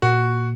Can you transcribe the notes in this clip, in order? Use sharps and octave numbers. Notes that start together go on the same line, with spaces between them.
A#2 F#4